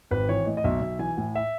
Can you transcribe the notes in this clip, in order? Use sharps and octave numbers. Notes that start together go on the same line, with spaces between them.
G#1 B4
E3 C#5
A2 D#5
D#5
B1 E5
B1
E3 G#5
A2
E5